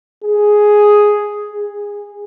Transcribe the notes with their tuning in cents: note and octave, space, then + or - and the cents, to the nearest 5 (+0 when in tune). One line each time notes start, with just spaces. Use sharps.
G#4 +5
G#4 -20